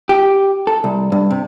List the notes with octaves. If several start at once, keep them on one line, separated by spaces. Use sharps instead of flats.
G4
A4
C2
G2
C3